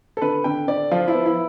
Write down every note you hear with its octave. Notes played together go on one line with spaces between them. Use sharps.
A4
D3 B4
D3 G5
D3 D5
F3 F4
E4
B3
E4